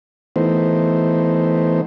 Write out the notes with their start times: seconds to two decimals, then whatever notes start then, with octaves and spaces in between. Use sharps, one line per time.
0.36 E3 A3 B3 D#4 C5